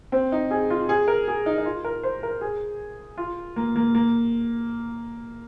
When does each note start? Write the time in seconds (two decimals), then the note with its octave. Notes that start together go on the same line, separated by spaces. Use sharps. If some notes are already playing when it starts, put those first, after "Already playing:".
0.12 C4
0.32 D#4
0.51 G#4
0.70 F4
0.89 G#4
1.08 A#4
1.28 G#4
1.46 D#4
1.58 D#4
1.65 F4
1.85 A#4
2.03 C5
2.23 A#4
2.41 G#4
3.18 F4
3.56 A#3
3.76 A#3
3.95 A#3